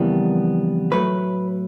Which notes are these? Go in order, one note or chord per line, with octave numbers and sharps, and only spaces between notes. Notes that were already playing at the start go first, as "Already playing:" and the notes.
Already playing: F2 C#3 E3 G3 B3 A#4
A2 F#3 A3 B4